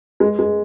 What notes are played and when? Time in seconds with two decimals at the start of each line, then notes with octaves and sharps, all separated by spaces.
0.20 G#3
0.39 G#3